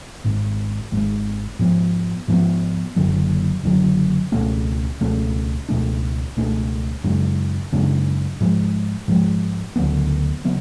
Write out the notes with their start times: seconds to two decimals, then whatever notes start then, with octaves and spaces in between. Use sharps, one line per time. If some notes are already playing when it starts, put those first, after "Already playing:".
0.24 G#1 G#2 G#3
0.92 G#1 G#2 G#3
1.59 G#2 F3 B3
2.28 G#2 F3 B3
2.96 F#1 F#2 D3 F#3
3.63 F#1 F#2 D3 F#3
4.32 C#2 B2 A3 C#4
5.00 C#2 B2 A3 C#4
5.69 C#2 B2 A3 D4
6.37 C#2 B2 A3 D4
7.04 F#2 C#3 G#3 D4
7.73 F#2 C#3 G#3 D4
8.41 G#2 F3 G#3
9.08 G#2 F3 G#3
9.76 D2 C#3 F#3 B3
10.45 C#3 F#3 B3